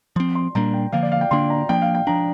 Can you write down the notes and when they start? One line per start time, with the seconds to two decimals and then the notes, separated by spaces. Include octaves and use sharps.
0.16 F3 C4 C6
0.35 C6
0.55 A#2 G3 A#3 D4 A#5
0.74 G5
0.92 D3 F3 A#3 F5
1.03 D5
1.12 F5
1.21 G5
1.31 D3 A#3 D4 C6
1.50 A#5
1.69 F3 A#3 D4 G5
1.82 F5
1.95 G5
2.07 F3 D4 A#5